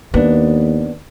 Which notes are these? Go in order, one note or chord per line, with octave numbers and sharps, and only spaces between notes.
D#2 A#3 B3 D4